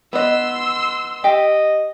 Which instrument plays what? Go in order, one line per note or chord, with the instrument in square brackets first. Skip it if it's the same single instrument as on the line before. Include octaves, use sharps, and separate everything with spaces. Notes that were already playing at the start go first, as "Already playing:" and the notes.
[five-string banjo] B3 D#5 [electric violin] C6 E6
[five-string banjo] G4 [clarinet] D#5